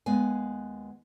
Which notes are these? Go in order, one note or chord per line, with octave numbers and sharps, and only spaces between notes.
D#2 G#3 B3 G#5